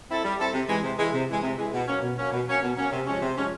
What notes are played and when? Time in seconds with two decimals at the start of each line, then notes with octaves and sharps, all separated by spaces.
0.09 C4 E4 A4
0.24 G3
0.39 C4 E4 A4
0.53 C3
0.69 E3 G#3
0.83 C3
0.98 E3 G#3
1.13 C3
1.28 E3 G#3
1.42 C3
1.57 E3 G#3
1.73 B2
1.87 F#3 A#3 C#4
2.02 B2
2.17 F#3 A#3 C#4
2.32 B2
2.47 F#3 A#3 C#4
2.62 B2
2.76 F#3 A#3 C#4
2.92 C3
3.06 F3 G#3 C#4
3.22 C3
3.36 F3 G#3 C#4